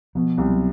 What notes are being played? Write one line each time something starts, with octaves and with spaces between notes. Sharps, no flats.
B2 F3
C2
F#3